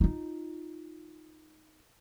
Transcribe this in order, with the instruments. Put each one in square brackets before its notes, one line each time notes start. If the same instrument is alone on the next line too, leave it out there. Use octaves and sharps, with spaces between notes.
[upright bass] D#4 F4